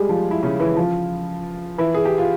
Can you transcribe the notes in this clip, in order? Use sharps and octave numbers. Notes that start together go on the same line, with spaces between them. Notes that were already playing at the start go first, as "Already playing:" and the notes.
Already playing: G3 G#3 G4 G#4
F3 F4
E4
C#3 C#4
E3 E4
F3 F4
E3 E4
G#4
G4
F4